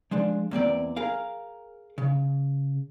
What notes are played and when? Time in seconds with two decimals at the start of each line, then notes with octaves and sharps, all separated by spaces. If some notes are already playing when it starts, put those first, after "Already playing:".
0.11 F3 G#3 D4
0.51 E2 A#3 C4 D5
0.96 G#4 A#4 F5
1.98 C#3